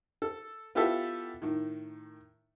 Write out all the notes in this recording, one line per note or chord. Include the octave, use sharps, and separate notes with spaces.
A4
B3 E4 F4 G4 A4 E5
A2 D#3